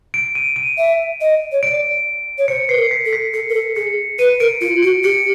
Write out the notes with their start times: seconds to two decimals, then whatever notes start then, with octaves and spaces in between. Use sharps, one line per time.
0.14 D7
0.35 D#7
0.56 D#7
0.78 E5
1.21 D#5
1.52 C#5
1.63 D5 D7
2.38 C#5
2.48 C5 C#7
2.69 B4 C7
2.77 A#4
2.91 B6
3.05 A4
3.13 B6
3.34 A4 C#7
3.49 A#4
3.54 A4
3.76 G#4 C#7
4.19 B4 D#7
4.40 A#4 D7
4.61 F4 C#7
4.82 F#4 D7
5.04 G4 C#7